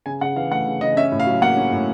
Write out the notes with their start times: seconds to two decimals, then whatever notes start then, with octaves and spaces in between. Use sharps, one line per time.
0.06 C#3 G#5
0.21 C#3 F#5
0.36 E3 F5
0.51 A3 F#5
0.67 C#3
0.81 C#3 D#5
0.97 C#4 E5
1.12 A2
1.20 F5
1.27 F#3
1.41 A#3 F#5
1.57 C#4
1.72 A2